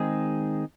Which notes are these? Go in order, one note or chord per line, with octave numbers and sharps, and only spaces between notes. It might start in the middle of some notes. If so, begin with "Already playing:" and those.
Already playing: D#3 G#3 C4 D#4 G#4